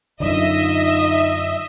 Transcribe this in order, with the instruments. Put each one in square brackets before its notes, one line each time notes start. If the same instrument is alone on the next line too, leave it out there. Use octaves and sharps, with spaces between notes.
[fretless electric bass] F#2 D3 [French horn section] D#4 F4 [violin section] D#5 E5